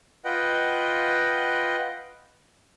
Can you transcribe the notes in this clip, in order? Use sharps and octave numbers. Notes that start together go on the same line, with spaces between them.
F4 B4 D#5 F#5 G5